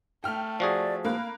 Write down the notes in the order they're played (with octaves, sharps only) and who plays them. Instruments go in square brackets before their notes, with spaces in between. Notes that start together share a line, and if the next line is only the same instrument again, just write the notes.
[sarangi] A3 [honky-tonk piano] G5 F6
[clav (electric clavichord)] F3 F#4 G#4 [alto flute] D5
[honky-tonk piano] A#3 B5 F#6 [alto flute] F5